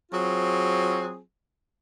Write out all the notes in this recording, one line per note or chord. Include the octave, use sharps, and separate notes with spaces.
F#3 C4 F4 G#4